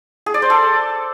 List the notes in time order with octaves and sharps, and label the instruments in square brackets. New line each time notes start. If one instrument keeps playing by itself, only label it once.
[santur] G#4
D5
C5
A4